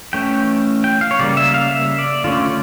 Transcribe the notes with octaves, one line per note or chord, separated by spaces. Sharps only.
E3 A3 C#4 G5
G5
F5
C#5
C#3 G3 A#3 D5
E5
F5
E5
D5
D3 A3 C#4 F4